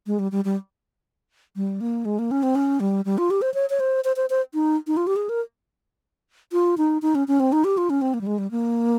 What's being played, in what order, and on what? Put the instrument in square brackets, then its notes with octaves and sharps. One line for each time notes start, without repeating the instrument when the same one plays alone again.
[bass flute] G#3
G3
G3
G3
G3
A#3
G#3
A#3
C#4
C4
C#4
G3
G3
F4
G4
C5
C#5
C#5
C5
C5
C5
C5
D#4
D#4
F4
G4
G#4
A#4
F4
D#4
D#4
C#4
C#4
C4
D#4
G4
F4
C#4
C4
A#3
G3
G#3
G3
A#3